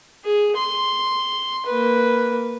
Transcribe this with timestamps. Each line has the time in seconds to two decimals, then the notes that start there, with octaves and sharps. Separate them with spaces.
0.24 G#4
0.57 C6
1.66 A#3 B4